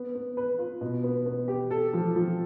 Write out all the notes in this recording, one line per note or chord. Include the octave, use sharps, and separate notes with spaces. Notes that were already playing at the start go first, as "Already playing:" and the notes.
Already playing: B3
B3
B4
F4
B2
B3
B3
G4
A4
F3
F3